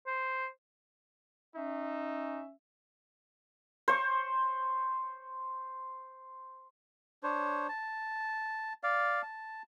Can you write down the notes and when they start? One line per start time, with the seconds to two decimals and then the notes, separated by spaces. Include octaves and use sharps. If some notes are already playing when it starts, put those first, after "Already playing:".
0.07 C5
1.55 C#4 D#4 E5
3.88 C5 C#6
7.23 D4 C5 C#5
7.69 A5
8.83 D5 F5
9.23 A5